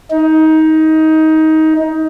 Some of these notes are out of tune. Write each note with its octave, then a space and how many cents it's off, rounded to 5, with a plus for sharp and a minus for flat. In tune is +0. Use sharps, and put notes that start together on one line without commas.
D#4 +20